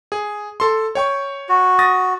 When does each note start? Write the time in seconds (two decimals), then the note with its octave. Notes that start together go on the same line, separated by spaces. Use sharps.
0.12 G#4
0.60 A4 C6
0.95 C#5 G5 C#6
1.49 F#4
1.79 D#6 A6 A#6